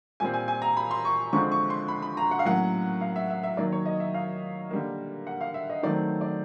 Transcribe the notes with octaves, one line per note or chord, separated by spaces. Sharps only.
A#2 G3 C4 G#5
G#5
G#5
A#5
B5
C6
C#6
D3 F3 G#3 C4 C#6
C#6
C6
B5
B5
A#5
F#5
F5
A2 F#3 A#3 C#4 F#5
F5
E5
E5
E5
D#3 F#3 A#3 D5
C#5
D#5
E5
F5
D3 G3 A#3
F#5
F5
E5
D#5
D#3 F#3 A3 C4 D5
D5